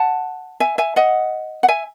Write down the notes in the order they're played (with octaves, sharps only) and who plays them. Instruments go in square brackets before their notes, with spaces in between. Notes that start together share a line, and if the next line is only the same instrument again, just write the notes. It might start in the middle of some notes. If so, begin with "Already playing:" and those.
Already playing: [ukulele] F#5 A5
E5 G#5
E5 G#5
D#5 F#5
F#5
E5 G#5